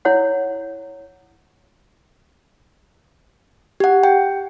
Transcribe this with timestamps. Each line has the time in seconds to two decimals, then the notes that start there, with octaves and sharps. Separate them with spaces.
0.05 E4 C#5 F#5
3.80 G4 F#5
4.04 G5